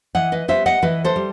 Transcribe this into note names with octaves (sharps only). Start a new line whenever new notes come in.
E3 D#5 F#5
B4 D#5
G3 B3 C5 E5
D#5 F#5
E3 B4 D#5
A4 C5
G3